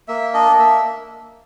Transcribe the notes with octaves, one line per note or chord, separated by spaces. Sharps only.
A#3 E5
D4 D#5
A#3 E5